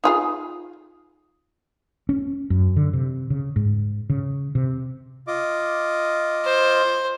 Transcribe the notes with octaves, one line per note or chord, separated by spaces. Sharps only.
D#4 F4 G#4
C#4
F#2
D3
C3
C#3
G#2
C#3
C3
F4 D#5 D6
C5